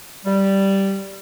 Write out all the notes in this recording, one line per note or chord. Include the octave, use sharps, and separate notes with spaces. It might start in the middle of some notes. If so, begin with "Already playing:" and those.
G3